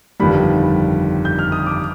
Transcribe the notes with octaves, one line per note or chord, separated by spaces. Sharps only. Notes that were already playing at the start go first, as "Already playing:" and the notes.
G1 F2 D#3 G3 B5
G6
F6
D#6
D6